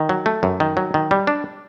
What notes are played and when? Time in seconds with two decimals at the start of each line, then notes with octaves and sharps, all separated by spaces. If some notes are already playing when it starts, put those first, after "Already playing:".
Already playing: D#3
0.09 F#3
0.26 A3
0.43 F#2
0.60 D#3
0.77 F#3
0.94 D#3
1.11 G3
1.27 D4